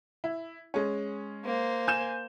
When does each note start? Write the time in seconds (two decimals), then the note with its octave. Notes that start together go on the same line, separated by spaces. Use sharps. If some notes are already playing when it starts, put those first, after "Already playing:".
0.24 E4
0.74 G#3 C#4
1.45 A#3 C5
1.87 G#5 G6 E7